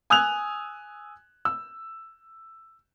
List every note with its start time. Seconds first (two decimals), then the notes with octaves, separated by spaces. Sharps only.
0.10 G#5 D#6 E6 F#6 G#6 F7
1.45 E6